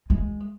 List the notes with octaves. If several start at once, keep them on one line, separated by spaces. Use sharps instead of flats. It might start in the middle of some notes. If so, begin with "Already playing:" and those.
G#3